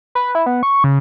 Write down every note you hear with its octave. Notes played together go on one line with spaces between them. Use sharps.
B4
E4
B3
C#6
C#3